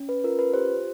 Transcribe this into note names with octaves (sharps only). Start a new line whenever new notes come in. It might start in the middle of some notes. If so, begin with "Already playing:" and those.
Already playing: C#4
B4
F4 A#4
B4
G4 C5